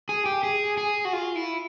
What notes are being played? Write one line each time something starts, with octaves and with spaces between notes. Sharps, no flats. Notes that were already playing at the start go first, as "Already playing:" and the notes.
G#4
G4
G#4
G#4
F#4
F4
E4